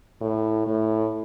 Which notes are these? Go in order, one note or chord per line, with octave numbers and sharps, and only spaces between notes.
A2
A2